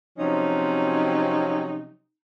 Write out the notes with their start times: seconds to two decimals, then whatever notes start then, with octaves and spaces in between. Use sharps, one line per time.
0.18 C3 F3 F#3 C4 C#4 D#4